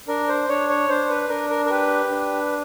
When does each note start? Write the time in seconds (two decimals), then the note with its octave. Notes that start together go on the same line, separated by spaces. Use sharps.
0.08 D4 A#4
0.28 C5
0.49 D4 C#5
0.69 C#5
0.89 D4 C5
1.09 B4
1.29 D4 A#4
1.50 A#4
1.65 A#4
1.70 G4 B4
2.10 D4